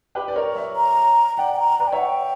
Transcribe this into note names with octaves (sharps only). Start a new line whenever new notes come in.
G4 B4
D5
A#4 C#5
C#5 E5
A#5
D5 F#5 G5
G5
A#5
B4 D5 A#5
G5
C#5 E5
F#5
G5